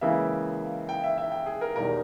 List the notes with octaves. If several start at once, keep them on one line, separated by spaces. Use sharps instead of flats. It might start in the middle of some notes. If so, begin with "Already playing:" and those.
C#2 C#3 E3 A#3 E5
G5
E5
E5
G5
G#4
A#4
E1 E2 D#3 G3 A#4